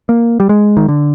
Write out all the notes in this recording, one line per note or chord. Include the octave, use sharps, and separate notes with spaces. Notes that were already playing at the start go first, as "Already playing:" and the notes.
A#3
G3
G#3
D#3
D3